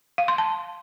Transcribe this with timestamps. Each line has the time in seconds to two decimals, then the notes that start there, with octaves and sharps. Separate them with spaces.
0.18 F5
0.28 C6
0.38 A5